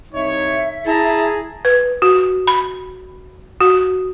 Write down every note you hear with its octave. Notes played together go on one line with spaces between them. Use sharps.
C2 D#4 C#5 E5
E4 G#4 A5 A#5
B4
F#4
B5
F#4